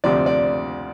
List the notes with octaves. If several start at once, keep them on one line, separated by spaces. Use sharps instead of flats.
D2 C3 F3 D5
D5